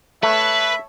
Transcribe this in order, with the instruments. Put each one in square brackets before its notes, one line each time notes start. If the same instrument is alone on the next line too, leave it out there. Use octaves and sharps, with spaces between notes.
[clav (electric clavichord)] A3 [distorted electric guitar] B4 [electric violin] C#5 A5 [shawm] E5